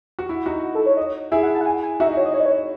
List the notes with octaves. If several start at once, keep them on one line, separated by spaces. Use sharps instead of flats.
F#4
E4
D#4 F#4
A4
C#5
D#5
E4 G#4 E5
F#5
A5
F#5
G#5
G#5
D#4 F#4 E5
D#5
C#5
D#5
C#5
D#5
C#5